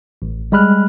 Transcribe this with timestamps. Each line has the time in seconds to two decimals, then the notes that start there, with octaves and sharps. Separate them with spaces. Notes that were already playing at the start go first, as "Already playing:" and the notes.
0.22 A1
0.52 G3 G#3 B5 F6 F#6